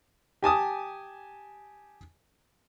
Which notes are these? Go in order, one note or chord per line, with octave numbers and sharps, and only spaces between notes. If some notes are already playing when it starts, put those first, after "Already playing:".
G4 G#5 A5 D#6